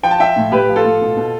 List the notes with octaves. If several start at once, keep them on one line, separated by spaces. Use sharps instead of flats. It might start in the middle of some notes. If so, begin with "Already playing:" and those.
F3 G5
A5
F3 E5 G5
A2
A2 G4 B4
F3
F4 A4
A2
B2
B2